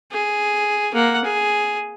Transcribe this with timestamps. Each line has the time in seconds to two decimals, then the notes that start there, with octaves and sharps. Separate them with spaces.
0.12 G#4
0.94 A#3 F#5
1.24 G#4